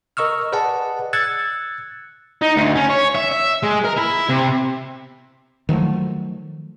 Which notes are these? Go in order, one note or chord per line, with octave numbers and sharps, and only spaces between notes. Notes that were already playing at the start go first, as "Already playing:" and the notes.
A#4 D#5 C#6 E6 F6
G#4 B4 D5 D#5 F#5 A5
E6 F#6 G#6 A6 C#7
D#4
D2
C#4
C#5
E5
E5
G#3
A#4
E4
C3
D#3 F3 F#3 A3